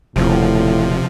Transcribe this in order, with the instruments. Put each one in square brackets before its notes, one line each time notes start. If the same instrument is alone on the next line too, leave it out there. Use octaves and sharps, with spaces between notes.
[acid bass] D#1 [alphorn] A2 [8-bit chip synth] C3 F3